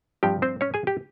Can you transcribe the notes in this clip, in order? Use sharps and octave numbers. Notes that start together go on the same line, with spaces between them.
G2 F3 C4 G4 G5
C4 C5
C#4 C#5
G#4 G#5
G4 G5